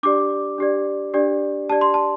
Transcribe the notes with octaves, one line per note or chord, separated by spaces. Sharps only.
D4 G4 D5 D6
D4 G4 D5
D4 G4 D5
D4 G4 D5 A5
C6
A5